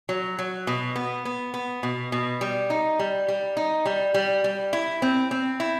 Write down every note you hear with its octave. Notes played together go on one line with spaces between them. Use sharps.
F#3
F#3
B2
B3
B3
B3
B2
B2
G3
D#4
G3
G3
D#4
G3
G3
G3
E4
C4
C4
E4